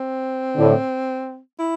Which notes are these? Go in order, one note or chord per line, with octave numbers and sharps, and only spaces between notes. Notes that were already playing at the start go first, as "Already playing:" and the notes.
Already playing: C4
A2 D3
E4